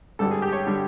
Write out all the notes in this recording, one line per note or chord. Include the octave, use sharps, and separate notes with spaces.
G#1 G2 D3 G3 A4
G#4
G4
C#5
D3 G3